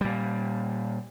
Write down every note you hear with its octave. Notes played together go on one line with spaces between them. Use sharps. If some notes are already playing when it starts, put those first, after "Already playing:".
A#2 G3